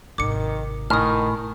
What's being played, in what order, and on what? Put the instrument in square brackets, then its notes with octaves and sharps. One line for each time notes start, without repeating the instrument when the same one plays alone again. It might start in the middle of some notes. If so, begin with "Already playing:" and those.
[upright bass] G#1 C3 [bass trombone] D#3 [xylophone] D6 C#7
[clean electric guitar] A2 G#5 [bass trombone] D#3 [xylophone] D#6 F6